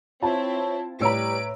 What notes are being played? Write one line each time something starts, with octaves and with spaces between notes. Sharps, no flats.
C4 E4 F4 C#5 A5
A2 G3 B4 C#5 A#5 E6 D7